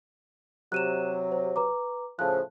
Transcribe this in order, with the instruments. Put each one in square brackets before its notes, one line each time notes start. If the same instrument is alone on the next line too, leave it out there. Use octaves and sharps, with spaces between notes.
[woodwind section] C3 F#3 [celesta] F#6 D#7 E7
[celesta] C5
B4 A#5 D6
[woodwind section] A2 C#3 F3 [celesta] A5 F#6